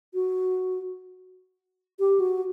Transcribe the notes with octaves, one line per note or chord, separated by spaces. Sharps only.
F#4
G4
F#4